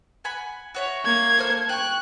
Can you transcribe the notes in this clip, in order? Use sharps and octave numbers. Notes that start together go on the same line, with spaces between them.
F#5 G#5 B5
F#4 C#5 E5
A#3 G#6
A4 C5 F6
G5 C#6 F#6